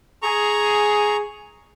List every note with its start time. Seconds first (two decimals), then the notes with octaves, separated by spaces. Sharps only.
0.23 G#4 A#5 C#6